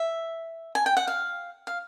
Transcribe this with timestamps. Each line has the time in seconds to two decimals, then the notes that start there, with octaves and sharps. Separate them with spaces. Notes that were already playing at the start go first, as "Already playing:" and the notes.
Already playing: E5
0.75 G#5
0.86 G5
0.97 F#5
1.07 F5
1.67 F5